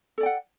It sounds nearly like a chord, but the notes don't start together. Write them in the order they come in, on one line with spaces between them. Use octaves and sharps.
A4 D5 G5 F#5